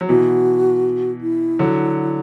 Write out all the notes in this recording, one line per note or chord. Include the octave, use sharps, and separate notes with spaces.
F#3
B2 E3 F#4
E4
D3 F#3